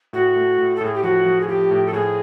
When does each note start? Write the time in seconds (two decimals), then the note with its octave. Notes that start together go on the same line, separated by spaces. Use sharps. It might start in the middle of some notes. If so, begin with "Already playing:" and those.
0.13 A2 F#4
0.36 A3
0.58 A2
0.76 A4
0.81 A2 G#4
0.94 G4
1.03 F3 F#4
1.26 F3
1.41 G#4
1.48 F3 G4
1.71 A2
1.86 A4
1.93 A2 G#4